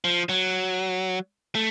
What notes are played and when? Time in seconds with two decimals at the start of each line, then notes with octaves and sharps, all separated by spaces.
0.04 F3
0.29 F#3
1.55 A3